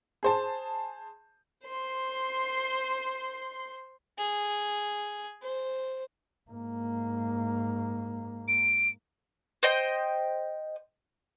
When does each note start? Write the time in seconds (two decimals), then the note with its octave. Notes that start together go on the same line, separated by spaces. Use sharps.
0.23 G#4 C5 A5
1.67 C5 C6
4.18 G#4
5.42 C5
6.51 G#2 A#3
8.48 D7
9.63 C5 D#5 G5